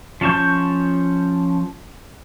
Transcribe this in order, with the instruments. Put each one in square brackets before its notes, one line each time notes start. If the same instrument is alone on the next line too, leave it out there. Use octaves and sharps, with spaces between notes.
[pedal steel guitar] F3 C#4 A5 C#6 G6